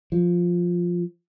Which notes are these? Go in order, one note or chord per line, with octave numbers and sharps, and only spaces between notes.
F3